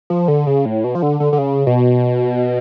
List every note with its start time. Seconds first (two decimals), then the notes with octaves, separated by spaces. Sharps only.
0.10 F3
0.28 D3
0.47 C#3
0.65 A2
0.84 B2
0.95 F3
1.02 D3
1.20 D3
1.33 D3
1.38 C#3
1.67 B2